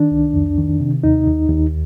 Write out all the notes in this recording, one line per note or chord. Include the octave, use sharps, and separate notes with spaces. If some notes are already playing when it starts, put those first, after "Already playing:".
Already playing: D#3 D4
C2
F2
D#3
C3
D#2 D#4
D#2
D#2